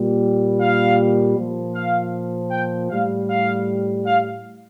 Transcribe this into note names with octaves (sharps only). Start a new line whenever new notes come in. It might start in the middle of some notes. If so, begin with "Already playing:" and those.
Already playing: A#2 G3
F5
A#2 F3
F5
G5
A2 G3 F5
F5
F5